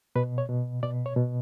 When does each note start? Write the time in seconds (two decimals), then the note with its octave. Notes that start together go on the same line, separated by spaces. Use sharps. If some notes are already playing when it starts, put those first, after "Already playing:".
0.16 B2 B4
0.38 C#5
0.49 B2
0.83 B2 D5
1.06 C#5
1.17 B2